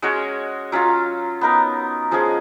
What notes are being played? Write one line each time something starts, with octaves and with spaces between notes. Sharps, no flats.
G#3 C#4 F#4 C#5
F#3 C#4 F4
B3 D#4 A#4
F3 G#3 C#4 G#4